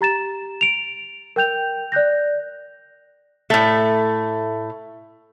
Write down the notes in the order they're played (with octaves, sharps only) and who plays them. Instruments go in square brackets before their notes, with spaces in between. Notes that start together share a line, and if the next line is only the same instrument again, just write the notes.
[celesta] G4 A#5 A6 E7
D7 F7
A#4 G5 G6 F7
D5 F#6 G6 A#6
[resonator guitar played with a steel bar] A2 A3